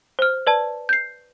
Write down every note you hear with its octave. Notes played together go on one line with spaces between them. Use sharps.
C5 F6
B4 D5 A5
G6 C7